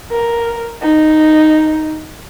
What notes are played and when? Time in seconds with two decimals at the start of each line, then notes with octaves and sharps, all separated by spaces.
0.12 A#4
0.82 D#4